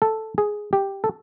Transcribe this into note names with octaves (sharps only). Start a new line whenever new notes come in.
A4
G#4
G4
A4